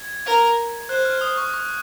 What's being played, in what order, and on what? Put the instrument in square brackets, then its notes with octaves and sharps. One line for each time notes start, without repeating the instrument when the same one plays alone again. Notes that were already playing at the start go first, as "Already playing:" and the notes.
Already playing: [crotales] G#6
[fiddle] A#4
[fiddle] C5 [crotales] F#6
[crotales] F6
D#6
C#6
C#6